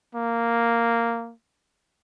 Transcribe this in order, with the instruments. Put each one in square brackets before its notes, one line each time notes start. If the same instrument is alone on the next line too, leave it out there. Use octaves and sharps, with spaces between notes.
[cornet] A#3